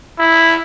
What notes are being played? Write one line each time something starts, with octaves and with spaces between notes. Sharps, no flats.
E4